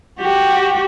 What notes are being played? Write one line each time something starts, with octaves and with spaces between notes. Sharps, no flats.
F#4 G4